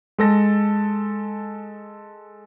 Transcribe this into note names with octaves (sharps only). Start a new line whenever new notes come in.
G#3 A4 A#6